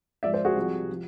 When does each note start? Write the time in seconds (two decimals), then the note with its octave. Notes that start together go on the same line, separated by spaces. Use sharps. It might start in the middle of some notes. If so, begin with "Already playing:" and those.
0.23 G#2 F3 G#3 D5 E5
0.33 C5 D5
0.45 F#4 G#4
0.56 C2 C3 F3
0.91 F3